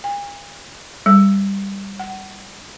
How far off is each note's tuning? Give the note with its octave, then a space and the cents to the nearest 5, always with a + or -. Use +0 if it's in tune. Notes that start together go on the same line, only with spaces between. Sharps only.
G#5 -45
G3 +10
F#5 +25